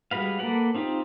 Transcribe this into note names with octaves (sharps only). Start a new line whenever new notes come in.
G3 G#3 F#4 B4 F5
A#3 A4 B4 D5 F#5
C4 D#4 F4 G4